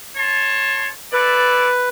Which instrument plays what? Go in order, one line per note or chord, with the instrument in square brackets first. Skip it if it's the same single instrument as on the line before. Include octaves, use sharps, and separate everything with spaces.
[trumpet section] C#5 A5 C6
[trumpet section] E4 A4 D5 [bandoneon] B4